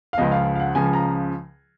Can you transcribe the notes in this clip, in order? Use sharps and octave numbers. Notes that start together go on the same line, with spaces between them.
F5
C#2 C#3 F3 D#5
F5
F5
F#5
C#2 C#3 F3 G#5
A#5